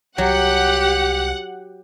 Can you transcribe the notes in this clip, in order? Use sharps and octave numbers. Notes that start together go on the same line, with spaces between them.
C2 F#3 G4 F#5